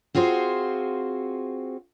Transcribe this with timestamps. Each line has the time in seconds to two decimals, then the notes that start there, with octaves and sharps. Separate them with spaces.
0.15 C4 F4 F#4 G#4 C5